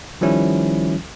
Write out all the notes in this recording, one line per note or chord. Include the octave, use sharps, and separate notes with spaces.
D#3 F3 G3 C#4 E4